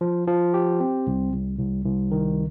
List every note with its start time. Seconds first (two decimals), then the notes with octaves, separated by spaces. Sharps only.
0.01 F3
0.27 F3
0.54 G4
0.80 C4
1.07 C2
1.33 C2
1.59 C2
1.85 C2
2.11 D#3